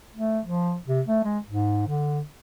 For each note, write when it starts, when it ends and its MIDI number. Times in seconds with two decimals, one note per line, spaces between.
0.16 0.39 57
0.45 0.75 53
0.87 1.01 48
1.08 1.19 57
1.24 1.39 56
1.46 1.84 44
1.87 2.20 50